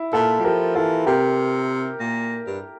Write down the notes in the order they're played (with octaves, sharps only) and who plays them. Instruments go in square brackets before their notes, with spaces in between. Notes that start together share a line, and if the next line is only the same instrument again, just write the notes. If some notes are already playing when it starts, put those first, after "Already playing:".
Already playing: [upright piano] E4
[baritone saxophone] A#2 [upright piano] F4 A4
[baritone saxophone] G3
[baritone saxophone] F3 [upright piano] G4 A#4
[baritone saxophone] E3 [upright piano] F4 A4
[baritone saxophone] C3 [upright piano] G4 A#4
[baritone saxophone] A#2
G2